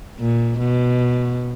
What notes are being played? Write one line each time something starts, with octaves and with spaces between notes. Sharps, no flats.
A#2
B2